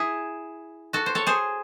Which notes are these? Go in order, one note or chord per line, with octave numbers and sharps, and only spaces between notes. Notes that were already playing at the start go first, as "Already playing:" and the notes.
Already playing: E4 G#4
F#4 A4
C5
A4 C#5
G#4 C5